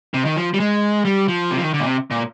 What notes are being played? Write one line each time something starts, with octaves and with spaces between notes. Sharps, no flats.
C3
D#3
F3
G3
G#3
G3
F3
C3
F3
D#3
D3
A#2
C3
A#2